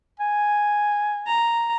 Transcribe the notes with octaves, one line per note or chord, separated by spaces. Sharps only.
G#5
A#5